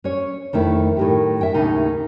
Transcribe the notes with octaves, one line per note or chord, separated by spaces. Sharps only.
C#4 C#5
F2 D#3 A3 E4
A2 D#3 G4
E4 E5 G5
D#2 A2 C#3 D#4